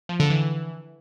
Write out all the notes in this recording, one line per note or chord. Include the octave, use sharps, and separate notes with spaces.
F3
D3
E3